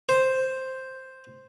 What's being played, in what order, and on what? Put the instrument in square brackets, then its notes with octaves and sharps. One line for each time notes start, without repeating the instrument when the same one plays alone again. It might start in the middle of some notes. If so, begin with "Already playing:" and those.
[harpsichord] C5